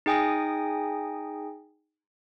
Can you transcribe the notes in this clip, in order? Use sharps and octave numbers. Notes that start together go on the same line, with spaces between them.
D#4 G#4 G5 G#5 D#6 A#6